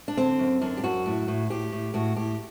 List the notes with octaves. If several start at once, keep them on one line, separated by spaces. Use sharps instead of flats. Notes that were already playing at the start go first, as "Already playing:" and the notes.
D4
D3 C4
F#2
F#2 D4
G4
F#2 F#4
A2
A2
A2 G4
A2
A2 F#4
A2 G4